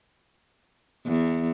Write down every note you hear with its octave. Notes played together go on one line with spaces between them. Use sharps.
E2